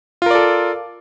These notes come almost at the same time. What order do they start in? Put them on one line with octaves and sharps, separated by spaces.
F4 A#4 D5 A4